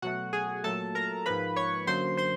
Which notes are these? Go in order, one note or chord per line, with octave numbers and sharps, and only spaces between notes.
B2 F#3 A3 F#4 F#5
G#4 G#5
A#2 F#3 A3 A4 A5
A#4 A#5
G#2 F3 A#3 B4 B5
C#5 C#6
F#2 D3 F#3 A#3 C5 C6
C5 C6